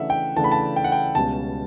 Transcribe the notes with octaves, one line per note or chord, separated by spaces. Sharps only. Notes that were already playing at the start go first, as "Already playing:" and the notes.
Already playing: C#3 E3 A3 D4 E5 F#5
G5
C#3 E3 A3 D4 A5
B5
A5
G5
F#5
G5
C#2 B2 G3 C#4 A5